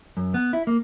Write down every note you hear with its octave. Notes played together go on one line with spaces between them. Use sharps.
F#2
B3
E4
A#3